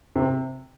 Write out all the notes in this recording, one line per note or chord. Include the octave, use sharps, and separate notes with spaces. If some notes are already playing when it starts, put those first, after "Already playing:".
C3